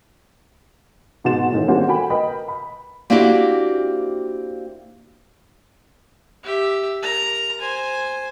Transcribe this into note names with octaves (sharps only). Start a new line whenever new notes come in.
G#2 B2 F#4 C6 A6 E7
A2 D#3 E3
G3 A#3 D4 F#4 G#4 C5
F#4 A4 G5 G#5 B5
A#4 B4 D#5 G5 B5
B5
A#3 C4 D4 E4 F#4 G4
G4 E5
A#4 A#5
C5 G#5